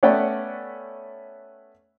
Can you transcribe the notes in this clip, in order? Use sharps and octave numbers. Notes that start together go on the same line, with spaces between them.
A3 B3 C#4 D5 F#5 G5